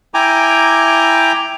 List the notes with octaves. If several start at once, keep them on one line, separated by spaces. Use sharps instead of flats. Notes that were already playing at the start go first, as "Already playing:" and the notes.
E4 G5 G#5 A#5 D6